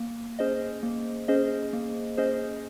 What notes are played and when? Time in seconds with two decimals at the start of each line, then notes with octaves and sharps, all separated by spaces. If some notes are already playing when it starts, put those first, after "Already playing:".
Already playing: A#3
0.39 C#4 G#4 C5 D#5
0.83 A#3
1.28 C#4 G#4 C5 D#5
1.73 A#3
2.17 C#4 G#4 C5 D#5